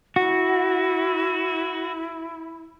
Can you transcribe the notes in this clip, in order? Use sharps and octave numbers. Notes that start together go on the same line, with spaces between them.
E4 F#4